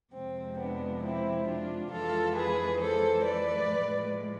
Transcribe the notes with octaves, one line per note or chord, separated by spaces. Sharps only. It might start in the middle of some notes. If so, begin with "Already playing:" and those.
F2 C3 F3 G#3 C4
B3 D4
C4 E4
D4 F4
F2 E3 G#3 F4 A4
G#4 B4
A4 C5
B4 D5
A2 F3 G#3